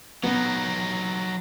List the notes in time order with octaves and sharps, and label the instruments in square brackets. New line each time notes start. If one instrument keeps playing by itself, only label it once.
[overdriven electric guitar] F#3 D#4 [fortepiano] B3